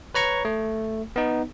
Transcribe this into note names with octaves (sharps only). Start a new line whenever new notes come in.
B4 C#5 A#5 C#6
A3
B3 D#4